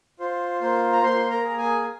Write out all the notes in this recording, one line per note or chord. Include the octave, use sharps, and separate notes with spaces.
F4 C5
A#3 C5
A#5
A#3 C5 C6
A#4 A#5
G#4
G#4 G#5
G#5